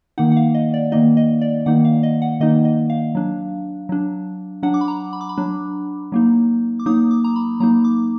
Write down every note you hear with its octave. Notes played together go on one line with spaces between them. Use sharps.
D#3 A#3 D#4 F#5
F#5
F5
D#5
D5
D#3 A#3 D#4 D#5
D#5
D5
D#3 A#3 D#4 F#5
F5
D#5
F#5
D#3 A#3 D#4 D#5
D#5
F5
F#3 D4
F#3 D4
F#3 D4 F#5
D6
B5
A#5
B5
D6
B5
F#3 D4
F#3 A#3 D#4
D6
F#3 A#3 D#4 D#6
D6
A#5
B5
F#3 A#3 D#4 A#5
D6